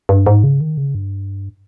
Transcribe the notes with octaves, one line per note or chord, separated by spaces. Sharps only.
G2
G#2
C#3
D#3
C#3
G2